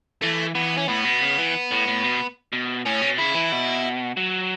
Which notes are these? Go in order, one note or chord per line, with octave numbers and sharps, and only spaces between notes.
E3 A3
E3 B3
C#4
A2 B3
B2
C#3
E3
A2
A2
B2
B2
A2 C#4
B2
C#3 E4
E3
B2
F#3